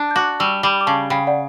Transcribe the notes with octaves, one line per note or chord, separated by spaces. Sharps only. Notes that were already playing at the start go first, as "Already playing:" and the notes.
Already playing: D4
G6
F#4 D6 F#6
G3 C#6 E6
G3 B5 D6
D6
C#3 A5 C#6
C#3 G5 B5
D5 F#5